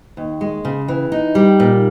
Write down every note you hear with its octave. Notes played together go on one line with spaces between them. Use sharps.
D#2
G#3
C#3
E3
D#4
G3
A#2